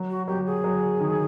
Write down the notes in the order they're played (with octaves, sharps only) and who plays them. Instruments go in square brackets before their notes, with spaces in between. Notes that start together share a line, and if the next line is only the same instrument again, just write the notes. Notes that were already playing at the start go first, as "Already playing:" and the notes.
Already playing: [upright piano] F#3
[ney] F#4
[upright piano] F#3 [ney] G4
[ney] G#4
[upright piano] F#3
D#3